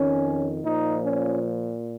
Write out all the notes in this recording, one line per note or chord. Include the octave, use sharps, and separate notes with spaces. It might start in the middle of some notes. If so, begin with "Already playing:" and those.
Already playing: F2 D#3 C#4
A#2 F3 D#4
C#4